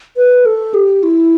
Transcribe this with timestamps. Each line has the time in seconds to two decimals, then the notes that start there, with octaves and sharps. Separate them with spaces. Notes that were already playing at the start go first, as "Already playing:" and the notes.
0.17 B4
0.46 A4
0.74 G4
1.03 E4